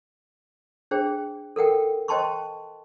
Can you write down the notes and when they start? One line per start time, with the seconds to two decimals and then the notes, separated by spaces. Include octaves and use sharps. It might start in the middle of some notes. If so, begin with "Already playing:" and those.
0.91 D4 G#4 C5 G5
1.56 A4 A#4 F#5 G5
2.08 C5 D#5 G5 A5 C6 C#6